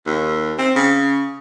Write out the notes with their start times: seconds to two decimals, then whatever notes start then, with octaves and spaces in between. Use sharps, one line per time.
0.06 D#2
0.58 C4
0.76 C#3